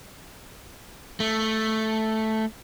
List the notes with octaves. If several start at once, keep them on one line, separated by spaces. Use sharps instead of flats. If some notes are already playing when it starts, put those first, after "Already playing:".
A3